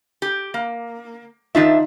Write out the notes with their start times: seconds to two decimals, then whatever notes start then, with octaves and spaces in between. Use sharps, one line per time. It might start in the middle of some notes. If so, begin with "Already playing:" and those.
0.22 G4
0.54 A#3
1.55 D#3 D4 D#4 F4 E5